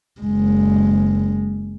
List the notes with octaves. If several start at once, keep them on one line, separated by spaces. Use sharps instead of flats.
F#1 G#3